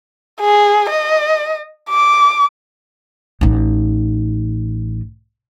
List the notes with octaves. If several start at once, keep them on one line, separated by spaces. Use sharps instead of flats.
G#4
D#5
D6
A1 D#4